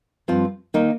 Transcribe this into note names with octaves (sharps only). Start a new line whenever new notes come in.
G2 F3 C4 F4
D#3 A#3 D#4